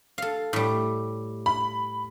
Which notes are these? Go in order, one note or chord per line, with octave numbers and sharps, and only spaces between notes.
A4 F5
A2 G3
B5